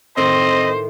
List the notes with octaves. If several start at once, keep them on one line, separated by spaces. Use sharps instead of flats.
A2 D#3 C4 C5 D#5